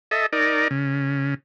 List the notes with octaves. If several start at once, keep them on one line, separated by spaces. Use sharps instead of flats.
A4 D#5 E5
D#4 A#4 D5
C#3